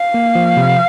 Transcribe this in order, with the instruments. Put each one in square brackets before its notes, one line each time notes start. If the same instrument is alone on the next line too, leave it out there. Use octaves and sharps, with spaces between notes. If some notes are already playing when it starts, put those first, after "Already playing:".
Already playing: [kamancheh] F5
[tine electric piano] A#3
F3
C3